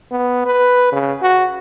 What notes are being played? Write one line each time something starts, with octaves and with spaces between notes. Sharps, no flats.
B3
B4
C#3
F#4